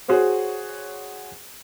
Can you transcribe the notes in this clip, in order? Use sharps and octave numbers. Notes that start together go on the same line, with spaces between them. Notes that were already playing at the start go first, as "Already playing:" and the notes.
F#4 G#4 C5 C#5